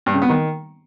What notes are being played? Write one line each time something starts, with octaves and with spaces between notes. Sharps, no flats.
G2
C#3
B3
D#3